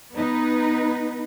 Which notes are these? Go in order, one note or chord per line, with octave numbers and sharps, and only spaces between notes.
B3 D#4 B4